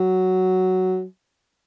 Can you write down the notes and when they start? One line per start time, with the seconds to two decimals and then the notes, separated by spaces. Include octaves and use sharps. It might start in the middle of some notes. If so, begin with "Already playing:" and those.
Already playing: F#3